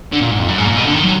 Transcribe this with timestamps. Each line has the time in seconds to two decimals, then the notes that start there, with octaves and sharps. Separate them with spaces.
0.13 D3
0.21 A#2
0.31 G#2
0.40 F2
0.49 F#2
0.58 G#2
0.67 A#2
0.77 B2
0.85 D3
0.94 D#3
1.04 F#3